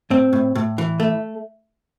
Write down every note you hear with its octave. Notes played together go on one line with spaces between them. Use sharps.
A2 C4
A2
A2
E3
A3